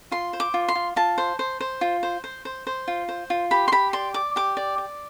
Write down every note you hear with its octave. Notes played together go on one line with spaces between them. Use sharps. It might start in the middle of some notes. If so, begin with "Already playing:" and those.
F4 C6
C5
D6
F4
C6
F4
F4 A5
C5
C5
C5
F4
C5
C5
C5
C5
F4
C5
F4
G4 B5
C6
G4 B5
D5 C6
D5 D6
G4 D6
D5
D5